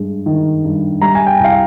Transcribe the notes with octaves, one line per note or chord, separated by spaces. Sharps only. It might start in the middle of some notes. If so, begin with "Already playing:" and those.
Already playing: G2 G#3
D#3
G2
G3 A#5
G#5
G5
C2 F5